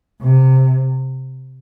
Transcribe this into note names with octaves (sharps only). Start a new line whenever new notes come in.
C3